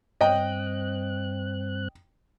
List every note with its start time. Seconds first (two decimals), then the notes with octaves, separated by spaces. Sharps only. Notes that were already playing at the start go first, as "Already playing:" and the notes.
0.21 G2 C4 D#5 G5 F#6